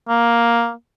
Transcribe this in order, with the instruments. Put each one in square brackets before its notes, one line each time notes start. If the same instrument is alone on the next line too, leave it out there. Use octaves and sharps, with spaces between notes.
[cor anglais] A#3